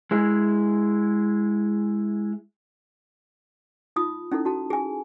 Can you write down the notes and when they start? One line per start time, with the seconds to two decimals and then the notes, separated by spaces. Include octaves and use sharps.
0.11 G#3 E4 G#4
3.96 D#4 F4 D#6
4.32 C#4 D#4 E4 A4
4.45 F#4 A5
4.70 G#4 G#5